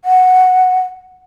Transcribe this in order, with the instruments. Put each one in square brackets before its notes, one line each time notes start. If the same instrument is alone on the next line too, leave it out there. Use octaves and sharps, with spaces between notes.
[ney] F#5